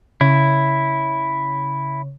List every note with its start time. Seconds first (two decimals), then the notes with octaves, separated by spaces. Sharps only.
0.21 C#3 E4